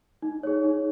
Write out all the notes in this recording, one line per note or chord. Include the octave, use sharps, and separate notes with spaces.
D#4
G#4 C#5
D#4